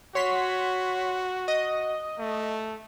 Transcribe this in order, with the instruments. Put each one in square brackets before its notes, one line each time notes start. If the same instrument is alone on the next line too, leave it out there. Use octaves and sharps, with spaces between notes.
[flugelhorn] F#4 [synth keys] C#5 C6 B6
[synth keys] D#5
[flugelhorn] A3